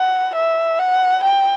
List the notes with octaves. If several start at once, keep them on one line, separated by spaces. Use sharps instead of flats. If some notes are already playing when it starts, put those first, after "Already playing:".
Already playing: F#5
E5
F#5
G5